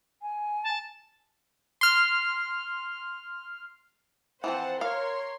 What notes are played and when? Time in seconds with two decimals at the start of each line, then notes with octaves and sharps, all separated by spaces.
0.22 G#5
0.63 A5
1.81 C6 F6
4.44 E3 F3 C4 C5 F#5 A5
4.81 A#4 C#5 F5 C6